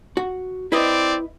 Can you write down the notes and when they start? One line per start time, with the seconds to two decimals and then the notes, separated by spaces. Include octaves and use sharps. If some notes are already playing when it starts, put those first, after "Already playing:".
0.17 F#4
0.72 C4 E4 B4 D5 D#5